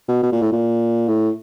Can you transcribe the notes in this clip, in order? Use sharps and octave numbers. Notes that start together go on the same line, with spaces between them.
B2
B2
A#2
A2
A#2
A2